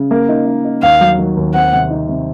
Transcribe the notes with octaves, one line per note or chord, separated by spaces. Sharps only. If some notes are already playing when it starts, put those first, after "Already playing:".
Already playing: C#3
A#3
D#4
D#4
D#4
D#2 F5
F#3
D#3
D#2
C4 F#5
C3
D#4
C3